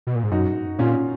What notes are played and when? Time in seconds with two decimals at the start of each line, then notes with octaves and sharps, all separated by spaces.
0.07 B2
0.15 A#2
0.23 G#2
0.31 F#2 D#4 F#4
0.79 A#2 C#4 F4